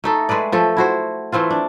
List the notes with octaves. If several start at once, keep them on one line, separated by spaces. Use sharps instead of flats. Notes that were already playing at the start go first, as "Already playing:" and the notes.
A3 D#4 A4
G#3 A3 B4 D5
F3 A3 A4
E4 F#4 C5
E3 A3 C4 F4
D4